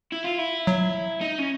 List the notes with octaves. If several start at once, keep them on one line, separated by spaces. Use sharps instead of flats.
E4
F4
E4
F#3
D#4
C#4